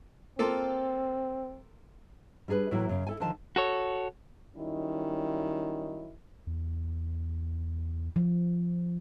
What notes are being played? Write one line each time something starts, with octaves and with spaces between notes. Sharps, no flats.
A#3 C4 F4 A4
G3 D4 G#4 A#4 B4
A2 E3 F#3 A#3 E4
F#2 C#3
E4 A4 G#5
D3 D#3 F3 A5
F#4 A4 C#5
D#3 F#3 G3 C#4 D#4 E4
E2
F3